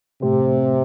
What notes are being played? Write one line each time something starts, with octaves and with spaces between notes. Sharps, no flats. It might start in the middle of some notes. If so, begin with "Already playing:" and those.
A2 C3 A3 C4 G4 C5